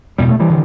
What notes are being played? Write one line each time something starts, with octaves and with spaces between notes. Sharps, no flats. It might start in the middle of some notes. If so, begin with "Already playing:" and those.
E2 B2 G3
A3
E3 G3
D3